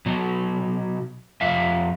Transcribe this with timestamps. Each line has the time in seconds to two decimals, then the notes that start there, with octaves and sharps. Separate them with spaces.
0.06 B2 F#3
1.41 F2 E5 F5